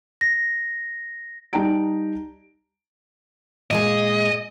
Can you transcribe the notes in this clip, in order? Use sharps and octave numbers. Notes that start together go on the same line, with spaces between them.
A#6
G3 D#4 G5 A5 A#5 D7
A#2 G#3 G#4 D#5